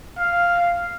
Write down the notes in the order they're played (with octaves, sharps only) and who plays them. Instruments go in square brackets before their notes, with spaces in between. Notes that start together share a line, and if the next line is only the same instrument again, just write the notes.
[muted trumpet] F5